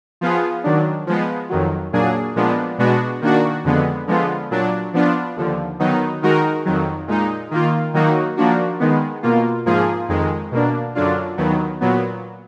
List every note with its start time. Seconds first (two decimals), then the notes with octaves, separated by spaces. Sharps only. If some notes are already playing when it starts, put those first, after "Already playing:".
0.21 F3 B3 F4 G#4
0.64 D#3 F#3 D4
1.07 F3 G#3 B3
1.50 F2 D#3 F#3
1.92 A#2 F#3 A#3 D4 G#4
2.36 A#2 F3 G#3 B3 D4
2.78 B2 G#3 B3 D4 F#4
3.21 D#3 A#3 D4 F#4
3.64 F2 D3 G#3 B3
4.07 D3 F3 G#3 B3 F4
4.51 A#2 F#3 D4
4.94 F3 B3 D4 F4
5.36 D#2 D3 F3
5.79 D#3 F#3 B3 D#4
6.22 D#3 G#3 D#4 F#4 A#4
6.65 F2 D#3 F#3
7.08 A#2 G#3 D#4
7.51 D#3 A#3 F4
7.94 D#3 F#3 A#3 D#4 F#4
8.37 F3 A#3 D4 F#4
8.80 D#3 G#3 B3
9.23 B2 A#3 F4
9.66 G#2 F3 A#3 F4 G#4
10.09 F2 D#3 G#3
10.52 B2 A#3 D4
10.95 F#2 D3 F#3 D4 F4
11.38 D#2 D#3 F#3 B3
11.81 A#2 F#3 B3